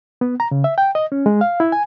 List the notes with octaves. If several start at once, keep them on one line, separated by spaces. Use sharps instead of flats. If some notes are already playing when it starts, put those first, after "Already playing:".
B3
A#5
C#3
E5
G5
D#5
C#4
G#3
F5
E4
G#5